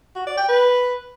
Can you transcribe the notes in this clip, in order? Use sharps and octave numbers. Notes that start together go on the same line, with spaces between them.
F#4
D5
G5
B4